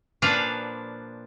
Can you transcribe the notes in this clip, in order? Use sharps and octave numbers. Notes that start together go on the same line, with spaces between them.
A#2 F3 D4 B4 D5 F5